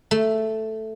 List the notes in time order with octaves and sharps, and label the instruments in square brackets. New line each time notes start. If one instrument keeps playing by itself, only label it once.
[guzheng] A3